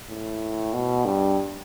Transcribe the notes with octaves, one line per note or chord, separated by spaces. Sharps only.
A2
B2
G2